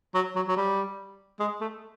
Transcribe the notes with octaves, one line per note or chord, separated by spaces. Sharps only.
F#3
F#3
F#3
G3
G#3
A3